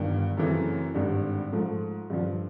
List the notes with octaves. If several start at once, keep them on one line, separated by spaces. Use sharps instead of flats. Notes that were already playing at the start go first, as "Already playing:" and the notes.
Already playing: G1 G2 D#3
F#2 C#3 E3 A3 C4
G#1 G2 D3 G3
G#2 F3 A3
G2 D3 F3